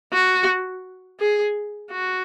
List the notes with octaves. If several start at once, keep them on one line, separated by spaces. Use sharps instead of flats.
F#4
G#4
F#4